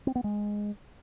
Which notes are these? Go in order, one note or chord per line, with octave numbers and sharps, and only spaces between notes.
C4
B3
G#3